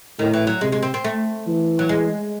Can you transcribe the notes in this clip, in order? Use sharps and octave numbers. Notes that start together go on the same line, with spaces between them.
A2 D#3
E3
F#3
C3 G#3
G#3
C4
C4
A3
E3
F#3
G#3